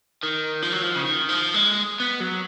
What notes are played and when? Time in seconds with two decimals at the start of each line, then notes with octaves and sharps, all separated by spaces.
0.23 D#3
0.62 F3
0.72 F#3
0.81 F3
0.95 C#3
1.02 D#3
1.29 F3
1.54 G#3
2.00 B3
2.20 F#3